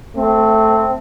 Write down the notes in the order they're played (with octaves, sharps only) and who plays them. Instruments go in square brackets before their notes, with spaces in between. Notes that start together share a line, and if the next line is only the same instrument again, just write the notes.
[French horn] A3 [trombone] C4